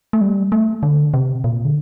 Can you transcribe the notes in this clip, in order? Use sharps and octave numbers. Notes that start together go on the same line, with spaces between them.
A3
G3
A3
D3
C3
A#2
D3